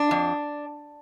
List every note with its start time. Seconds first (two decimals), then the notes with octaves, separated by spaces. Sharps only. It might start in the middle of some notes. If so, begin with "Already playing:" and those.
Already playing: D4
0.11 F2